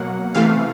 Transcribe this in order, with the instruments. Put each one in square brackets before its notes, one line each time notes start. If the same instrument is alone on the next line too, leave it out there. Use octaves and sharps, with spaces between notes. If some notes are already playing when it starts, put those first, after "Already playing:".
Already playing: [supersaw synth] B2 F#3 A#3 F#5
C3 E3 A3 F5